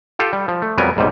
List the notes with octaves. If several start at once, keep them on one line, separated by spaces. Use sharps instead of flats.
F4 G4 A4 F5 G5
G3
F3
A3
F2 F#3 G3 B3 A#4 G#5
B1 G#2 C3 G3